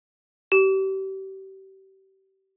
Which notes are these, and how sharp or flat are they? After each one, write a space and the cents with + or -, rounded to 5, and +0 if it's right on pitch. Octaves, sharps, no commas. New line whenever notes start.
G4 -35